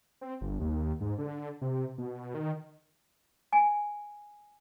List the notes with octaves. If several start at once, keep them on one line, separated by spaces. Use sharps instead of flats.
C4
G1
D#2
G#2
D3
C3
B2
D#3
G#5